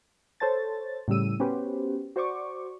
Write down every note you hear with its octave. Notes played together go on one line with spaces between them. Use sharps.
A4 C5 C#5 A5 A6
A2 C#3 G3 E6 D#7
B3 C#4 F#4 G4 B4 C5
F#4 C5 D5 C#6 D6